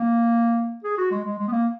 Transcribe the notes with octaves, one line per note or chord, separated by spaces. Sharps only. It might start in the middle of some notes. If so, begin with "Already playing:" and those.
Already playing: A#3
G#4
F#4
G#3
G#3
G#3
B3
A#3